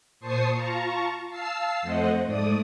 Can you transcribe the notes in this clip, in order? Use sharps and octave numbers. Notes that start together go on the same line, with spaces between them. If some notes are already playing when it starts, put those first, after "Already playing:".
A#2 C5 A5 C#6 D#6 C7
F4 A5 A#5 C#6
F5 A5 E6 C7
F2 F3 A3 C5 D#5 F#5
G#2 A3 D5 D#6